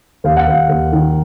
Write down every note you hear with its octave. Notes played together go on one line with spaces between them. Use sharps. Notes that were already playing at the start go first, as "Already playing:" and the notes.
D#2 F5
F#5
D#2 F5
D#2
D#3